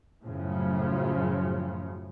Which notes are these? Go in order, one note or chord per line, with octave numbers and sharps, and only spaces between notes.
F#2 A2 C#3 F3